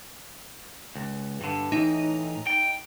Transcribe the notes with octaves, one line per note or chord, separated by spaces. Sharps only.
C#2
G2 D3
A2 E3 D#4
G5